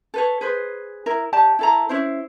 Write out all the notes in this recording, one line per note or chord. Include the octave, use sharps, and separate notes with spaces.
A4 B4 C#5
G#4 B4 C5
E4 A#4
G4 D5 A5
E4 A4 A#5
C#4 E4 C5